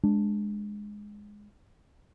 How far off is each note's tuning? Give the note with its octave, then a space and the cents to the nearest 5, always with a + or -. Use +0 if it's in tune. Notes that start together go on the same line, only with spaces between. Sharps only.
G#3 +0 D4 +0